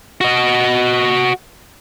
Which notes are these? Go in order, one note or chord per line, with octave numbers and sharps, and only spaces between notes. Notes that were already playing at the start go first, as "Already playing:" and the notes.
F#4 D#5